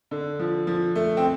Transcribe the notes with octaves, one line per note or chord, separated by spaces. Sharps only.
D3
F3
F3
A3
C4